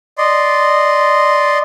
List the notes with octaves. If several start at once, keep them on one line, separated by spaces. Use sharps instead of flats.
D5 D#5 C6